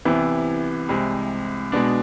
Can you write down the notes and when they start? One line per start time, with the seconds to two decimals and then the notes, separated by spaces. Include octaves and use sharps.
0.05 C2 C3 E3 B3 E4
0.89 C2 C3 G#3
1.72 B2 G#3 B3 D4